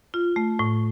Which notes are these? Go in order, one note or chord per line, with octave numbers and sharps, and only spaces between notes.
F4
A3
A2